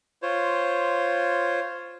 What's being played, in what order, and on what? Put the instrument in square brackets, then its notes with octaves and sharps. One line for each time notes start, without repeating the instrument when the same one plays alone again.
[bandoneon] F4 C5 C#5